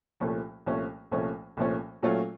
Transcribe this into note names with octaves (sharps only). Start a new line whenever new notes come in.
C2 A#2 F3 A3 C#4
C2 A#2 F3 A3 C#4
C2 A#2 F3 A3 C#4
C2 A#2 F3 A3 C#4
A#2 F#3 A3 C#4 F4